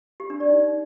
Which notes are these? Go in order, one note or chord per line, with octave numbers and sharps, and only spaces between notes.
G4
D4
D5
D#4